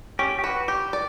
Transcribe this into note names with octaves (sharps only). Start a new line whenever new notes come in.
C#4 G4
G4
F#4 B4
G4
D5